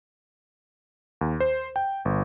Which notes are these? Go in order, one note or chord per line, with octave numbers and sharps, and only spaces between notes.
D#2
C5
G5
G1